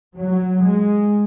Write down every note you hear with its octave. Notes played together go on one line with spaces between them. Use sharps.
F#3
G#3